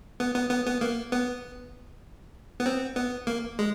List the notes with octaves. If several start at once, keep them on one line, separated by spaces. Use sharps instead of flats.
B3
B3
B3
B3
A#3
B3
B3
C4
B3
A#3
G#3